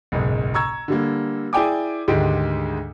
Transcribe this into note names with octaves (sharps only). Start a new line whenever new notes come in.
F#1 B1 G#2
A#5 C#6 E6 G#6
D3 G3 A#3
E4 G#4 D5 G5 G#5 D6
D2 G#2 D#3 G#3 G4 D7